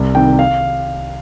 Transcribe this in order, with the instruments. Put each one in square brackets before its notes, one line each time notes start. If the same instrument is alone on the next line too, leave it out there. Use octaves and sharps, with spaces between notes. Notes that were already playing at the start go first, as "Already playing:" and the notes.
Already playing: [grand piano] C2
C3 D#3 G5
F5